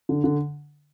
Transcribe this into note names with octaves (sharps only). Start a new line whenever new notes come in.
D3
D3